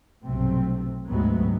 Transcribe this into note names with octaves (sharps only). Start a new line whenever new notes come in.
B1 G2 C3 F#3 A3 C4
D2 G#2 C3 F#3 G#3 B3